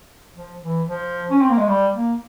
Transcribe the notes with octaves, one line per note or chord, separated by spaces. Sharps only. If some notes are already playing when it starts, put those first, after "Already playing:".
F3
E3
F3
C#4
C4
A#3
G#3
G3
A#3